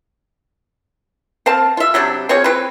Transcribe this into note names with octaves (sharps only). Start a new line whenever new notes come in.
C4 C5 F5 A5
F4 E5
C3 F#3 G3 D4
C4 F4 G#4 C#5
C4 B4